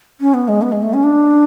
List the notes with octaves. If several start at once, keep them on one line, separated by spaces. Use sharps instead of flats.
C#4
B3
G#3
B3
G#3
A3
C#4
D4